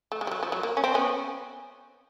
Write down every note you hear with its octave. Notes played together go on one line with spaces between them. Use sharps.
A3
G#3
G3
F#3
F3
F#3
A#3
C#4
C4
B3 C#4